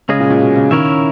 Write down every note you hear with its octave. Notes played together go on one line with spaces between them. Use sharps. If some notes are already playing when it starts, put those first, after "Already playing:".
C#3 G#3 C#4 G#4 D#5
A#2
A#2
B2
C#3
D#3 C#4 E4 A#4 C#5 E5